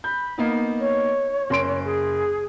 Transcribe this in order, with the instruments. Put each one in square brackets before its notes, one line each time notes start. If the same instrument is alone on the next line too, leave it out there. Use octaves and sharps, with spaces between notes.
[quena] B5 [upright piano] G6
[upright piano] A#3 B3 D#4
[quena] C#5
[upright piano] F#1 C6 D7
[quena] G#4